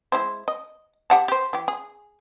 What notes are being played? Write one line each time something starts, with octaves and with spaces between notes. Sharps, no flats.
G#3 E4 C5
D#5
G4 F#5 A5
G4 C5
E3 G4
G#4